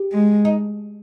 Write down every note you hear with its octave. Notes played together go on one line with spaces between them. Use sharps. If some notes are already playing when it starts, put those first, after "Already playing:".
Already playing: G4
G#3
D#4